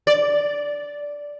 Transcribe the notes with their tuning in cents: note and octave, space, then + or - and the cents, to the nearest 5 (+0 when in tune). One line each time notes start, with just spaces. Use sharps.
D5 -10